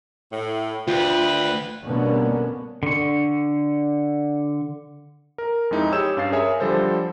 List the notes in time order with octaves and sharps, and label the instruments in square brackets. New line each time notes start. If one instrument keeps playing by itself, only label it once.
[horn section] A2
[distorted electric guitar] D2 [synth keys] F4 [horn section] B4 G5
[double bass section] B2 D3 G3 A#3 B3 C#4
[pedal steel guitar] D3 C#6
[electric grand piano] A#4
F2 G#3 D#4 E4
G4 G#4 C#5 E6 G6 E7
G2 C#4 F5 A6 C7
G#4 A#4 C#5 E5 G#5
D3 F3 G3 A4 C5